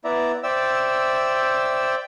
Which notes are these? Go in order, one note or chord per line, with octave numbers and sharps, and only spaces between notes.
B3 E4 D5 E5 A#5
C5 D5 E5 G5 E6